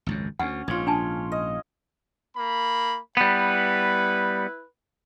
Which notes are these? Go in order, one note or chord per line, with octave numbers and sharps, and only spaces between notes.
G#1 C#2 F#2
D2 C#4 F#5
A#1 G#2 F4 C#5
D4 G#5 A5
D#5
A#3 B5
G3 B3 E4 B4